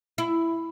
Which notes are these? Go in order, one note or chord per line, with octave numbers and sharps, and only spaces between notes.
E4